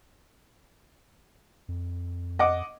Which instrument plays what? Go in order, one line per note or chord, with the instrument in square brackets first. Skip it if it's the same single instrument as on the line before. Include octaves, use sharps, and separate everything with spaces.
[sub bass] F2
[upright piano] D#5 F#5 D6